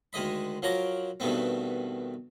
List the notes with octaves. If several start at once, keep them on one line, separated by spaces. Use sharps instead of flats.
D2 D#3 G#3 D#5 B5
F3 F#3 A#4 C#5 A#5 D6
G2 B2 D#3 A3 B3 C4